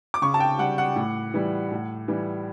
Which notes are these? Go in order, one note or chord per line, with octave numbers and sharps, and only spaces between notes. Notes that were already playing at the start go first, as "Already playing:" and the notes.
D6
C#3 C#6
A5
G5
G3 F#5
F#5
A2
E3 G3
A2
E3 G3